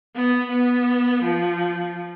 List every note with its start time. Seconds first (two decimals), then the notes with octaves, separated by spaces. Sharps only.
0.16 B3
0.51 B3
1.22 F3